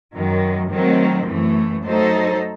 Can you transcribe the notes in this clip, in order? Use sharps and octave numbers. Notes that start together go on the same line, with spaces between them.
F#2 D#3 F#3
D#3 F#3 A3 C4
F#2 E3 A3
F#3 A3 D#4 A4 C5